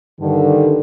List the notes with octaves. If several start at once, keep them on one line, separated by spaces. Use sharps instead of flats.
G2 D3 D#3